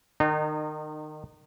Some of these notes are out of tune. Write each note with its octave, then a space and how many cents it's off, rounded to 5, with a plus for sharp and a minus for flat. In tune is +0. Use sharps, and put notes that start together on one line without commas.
D#3 -25 D#4 -40